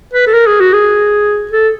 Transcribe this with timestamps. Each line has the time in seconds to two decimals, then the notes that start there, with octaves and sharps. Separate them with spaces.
0.13 B4
0.27 A4
0.33 A#4
0.47 G#4
0.60 F#4
0.73 G#4
1.51 A4